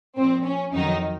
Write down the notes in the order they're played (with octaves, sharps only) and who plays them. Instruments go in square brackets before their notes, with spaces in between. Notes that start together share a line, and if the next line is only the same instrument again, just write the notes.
[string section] A#2 F3 C4
C#4
F2 D#3 F#3 D#4